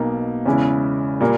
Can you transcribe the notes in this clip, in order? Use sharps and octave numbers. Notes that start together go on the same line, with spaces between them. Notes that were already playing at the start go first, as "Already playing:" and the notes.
Already playing: B1 B2 A#3 D#4
E2 C#3 G#3 C#4 E4
A#2 G3 A#3